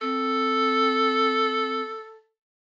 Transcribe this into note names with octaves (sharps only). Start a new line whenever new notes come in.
C4 A4